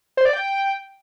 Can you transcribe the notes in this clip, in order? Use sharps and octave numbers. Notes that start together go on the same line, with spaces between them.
C5
D5
G5